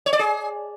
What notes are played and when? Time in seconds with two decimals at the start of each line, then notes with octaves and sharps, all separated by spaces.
0.06 C#5
0.13 D5
0.19 G#4